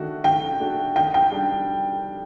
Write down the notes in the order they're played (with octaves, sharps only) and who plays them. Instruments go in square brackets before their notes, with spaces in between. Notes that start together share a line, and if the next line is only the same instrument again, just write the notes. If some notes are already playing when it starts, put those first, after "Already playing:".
Already playing: [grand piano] D#3 A3 D4 F#4
[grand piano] D#3 [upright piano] G5
[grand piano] A3 D4 F#4
[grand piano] D#3 [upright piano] G5
[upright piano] G5
[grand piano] G3 D4